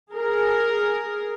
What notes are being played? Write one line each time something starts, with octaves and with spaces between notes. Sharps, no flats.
G#4 A#4